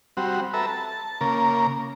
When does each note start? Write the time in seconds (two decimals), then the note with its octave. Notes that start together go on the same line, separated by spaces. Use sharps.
0.17 G3 C4 F#4
0.54 A4 B4 E5 A#5
0.66 A5
1.21 C#3 A#3 A#4